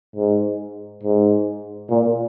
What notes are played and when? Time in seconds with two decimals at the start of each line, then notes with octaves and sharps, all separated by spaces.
0.16 G#2
1.03 G#2
1.90 A#2